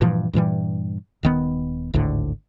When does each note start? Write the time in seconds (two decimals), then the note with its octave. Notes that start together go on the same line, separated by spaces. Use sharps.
0.01 G2 A#2 E3 F3
0.33 G2 A#2 E3 G3
1.23 D#1 D#3 B3
1.94 G#1 D2 A2 D3